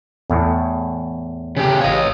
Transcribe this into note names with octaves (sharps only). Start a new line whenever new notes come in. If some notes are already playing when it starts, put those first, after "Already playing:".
E2 A2
C#3 G4
A1 C#5 D#5 F5